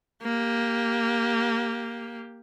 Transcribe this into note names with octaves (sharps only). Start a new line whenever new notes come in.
A#3 G4